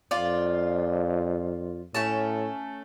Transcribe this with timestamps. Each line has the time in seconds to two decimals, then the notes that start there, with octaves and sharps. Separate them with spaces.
0.11 F2 F4 D5
1.95 A2 A3 C#4 A5